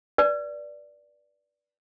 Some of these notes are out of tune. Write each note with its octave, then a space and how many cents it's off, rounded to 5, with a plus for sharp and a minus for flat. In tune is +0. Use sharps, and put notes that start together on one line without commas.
B4 -30 D5 +0